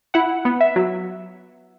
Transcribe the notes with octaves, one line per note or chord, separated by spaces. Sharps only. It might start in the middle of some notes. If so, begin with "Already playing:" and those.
E4 F#5
B3
E5
F#3